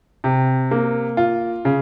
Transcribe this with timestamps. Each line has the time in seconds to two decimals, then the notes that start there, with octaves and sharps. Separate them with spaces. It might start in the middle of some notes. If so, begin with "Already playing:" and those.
0.24 C3
0.71 A#3
1.17 F4
1.65 C#3